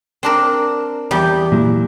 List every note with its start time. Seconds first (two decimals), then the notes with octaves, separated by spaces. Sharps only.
0.23 C4 D4 A#4
1.11 E2 G3
1.52 A#2 F#3 E4